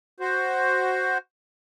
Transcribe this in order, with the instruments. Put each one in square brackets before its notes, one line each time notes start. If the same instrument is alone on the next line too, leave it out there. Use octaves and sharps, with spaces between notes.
[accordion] F#4 C5